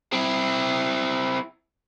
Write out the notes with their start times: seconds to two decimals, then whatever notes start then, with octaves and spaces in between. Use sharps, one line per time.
0.12 C4 E4